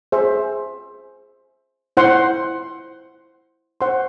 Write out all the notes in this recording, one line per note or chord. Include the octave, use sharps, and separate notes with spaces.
G#4 C5 E5
E4 C5 F#5 C6
C5 F#5 C6